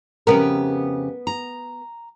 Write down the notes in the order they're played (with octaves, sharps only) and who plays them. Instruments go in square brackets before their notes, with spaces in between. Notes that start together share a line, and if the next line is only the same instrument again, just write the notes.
[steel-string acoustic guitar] F2 C#3 G4 [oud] B3 A#4
[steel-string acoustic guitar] A#5